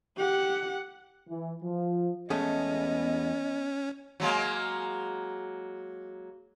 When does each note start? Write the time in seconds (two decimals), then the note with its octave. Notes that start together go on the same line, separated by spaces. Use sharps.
0.17 G4 F#5
1.29 E3
1.62 F3
2.30 E2 G#3 A3 B3 C#4 D#5
4.20 F#3 G#3 A#3